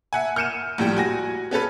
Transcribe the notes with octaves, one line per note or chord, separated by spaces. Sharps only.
E5 F#5 G#5
F6 G6 C#7 D#7 E7
A#1 A2 G3 G5
F#4 G#5 A#6
B3 C#4 A4 B4